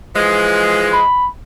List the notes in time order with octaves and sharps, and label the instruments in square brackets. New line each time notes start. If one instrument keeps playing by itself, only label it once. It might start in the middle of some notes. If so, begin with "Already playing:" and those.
[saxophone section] E3 F3 G#3
[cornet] B5